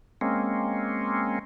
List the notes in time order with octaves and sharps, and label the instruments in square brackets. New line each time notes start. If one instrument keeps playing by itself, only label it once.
[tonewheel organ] G#3 A#3 C4 C#4